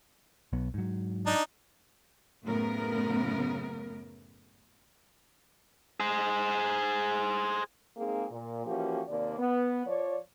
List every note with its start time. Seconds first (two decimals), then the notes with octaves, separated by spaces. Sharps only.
0.53 B1 F#3 B3
0.74 G#2 F#3
1.26 D4 D#4
2.44 F#2 A2 C#3 B3 A#4
6.00 G#4 C5
7.97 G#3 A#3 C4 D#4 G#4
8.30 A#2
8.66 E3 F3 A#3 C#4 F#4 G4
9.08 D#2 C3 A#3 D5
9.38 B3
9.86 F3 C#5 D5